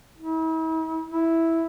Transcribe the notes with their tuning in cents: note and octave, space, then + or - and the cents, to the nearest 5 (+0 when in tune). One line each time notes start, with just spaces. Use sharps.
E4 -45
E4 -5